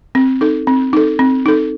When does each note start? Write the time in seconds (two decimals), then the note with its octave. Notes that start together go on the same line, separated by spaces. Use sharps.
0.15 C4
0.41 D#4 A4
0.67 C4
0.93 D#4 A4
1.19 C4
1.46 D#4 A4